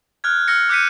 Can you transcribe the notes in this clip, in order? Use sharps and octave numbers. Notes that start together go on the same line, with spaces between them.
F6 F#6 G#6
E6 F6 A#6 C#7
D6 F#6 G6 B6 C#7 D#7